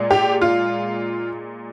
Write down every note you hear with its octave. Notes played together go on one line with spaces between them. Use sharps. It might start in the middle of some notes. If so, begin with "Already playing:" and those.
Already playing: A#2 G#3
G4
F4